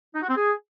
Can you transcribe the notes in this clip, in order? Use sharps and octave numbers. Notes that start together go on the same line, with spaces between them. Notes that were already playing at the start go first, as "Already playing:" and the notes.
D#4
F#4
C4
G#4